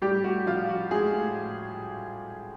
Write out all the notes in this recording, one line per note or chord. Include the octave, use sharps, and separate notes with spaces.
A2 G3 G4
A2 F#4
F3 F4
F3 F#4
A2 G#3 G#4
A2